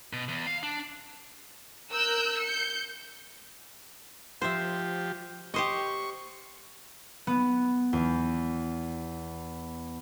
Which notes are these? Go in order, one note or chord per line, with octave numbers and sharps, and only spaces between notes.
B2
E2
F5
D4
A#4 E6 F#6 G6
G6 C#7
F3 G4 C5 E5
G4 C5 D#5 C#6
B3
E2